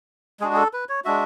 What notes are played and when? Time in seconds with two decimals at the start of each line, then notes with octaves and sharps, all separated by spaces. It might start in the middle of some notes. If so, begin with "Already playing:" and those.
0.40 G#3 D4 F#4 G#4
0.53 G#4
0.57 A4
0.73 B4
0.89 C#5
1.05 G#3 D4 F#4 E5